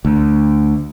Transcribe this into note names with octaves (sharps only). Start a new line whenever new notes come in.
D2